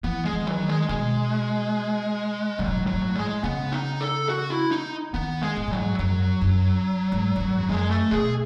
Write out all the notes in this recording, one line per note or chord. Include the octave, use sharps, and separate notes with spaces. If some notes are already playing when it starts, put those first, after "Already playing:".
E3 B3
G#3
E3
D#3
E3 F#3
D#3
G#3
B2 G#3
B2 F#3
A2
G#2
A2 F#3
G#2
A2
G#3
C#3 B3
D#4
A4
F#4
E4
D#4
D#3 B3
G#3
G#2
A2 F#3
G#2
F#2 F#3
F#2
G#2
E2
F#2
E2
F#2 G#3
A3
B2 G#4